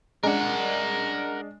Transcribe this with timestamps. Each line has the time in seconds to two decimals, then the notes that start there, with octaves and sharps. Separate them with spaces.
0.23 G#3 D4 A#4 F#5